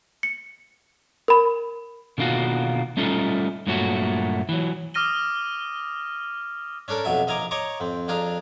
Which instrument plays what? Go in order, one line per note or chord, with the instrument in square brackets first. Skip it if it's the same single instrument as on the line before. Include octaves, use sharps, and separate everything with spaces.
[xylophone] C#7
A#4 B5
[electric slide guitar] B2 D3 D#3 A#3 F4 F#4
G3 A3 C#4 D#4 F4 A4
G2 A#2 F#3 A3 F#4
E3 F#3
[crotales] D6 D#6 F6 A#6 D#7 G7
[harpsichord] C#4 D4 A4 A#4 A5
B1 F2 B2 F#3 E5
A#1 D#5 F5 G#5 A#5 D6
C#5 D#5 A#5 C#6 D6
F2 C4
F2 D4 G#4 F5 A#5